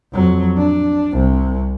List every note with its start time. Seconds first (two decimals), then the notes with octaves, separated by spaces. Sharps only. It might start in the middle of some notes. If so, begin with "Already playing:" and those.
0.13 F2 F#3
0.57 D4
1.13 C2 C3